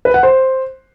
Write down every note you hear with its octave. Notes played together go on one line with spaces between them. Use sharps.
B4
F#5
C5